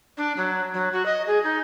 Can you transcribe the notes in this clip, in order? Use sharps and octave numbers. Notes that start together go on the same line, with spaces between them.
D4
F#3
F#3
F#4
D#5
G#4
D#4